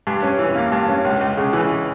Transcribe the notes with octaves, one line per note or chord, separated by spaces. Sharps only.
G2
C#4
E3
A#3
G2
C#4
C#2
C#2
C#3
E3